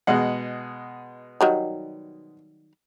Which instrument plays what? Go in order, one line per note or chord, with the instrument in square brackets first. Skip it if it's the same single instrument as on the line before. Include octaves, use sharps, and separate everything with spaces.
[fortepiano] B2 G#3 F#5
[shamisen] D#3 F#3 G3